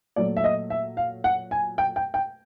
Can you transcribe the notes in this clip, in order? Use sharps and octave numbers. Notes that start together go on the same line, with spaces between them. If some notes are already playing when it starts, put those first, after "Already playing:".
A#2 F#3 A3 D5
E5
D#5
E5
F5
F#5
G#5
G5
G5
G5